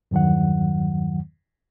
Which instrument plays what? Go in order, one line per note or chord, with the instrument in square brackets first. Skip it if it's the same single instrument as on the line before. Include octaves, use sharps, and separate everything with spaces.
[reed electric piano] E2 G2 D#3 F#3 F#5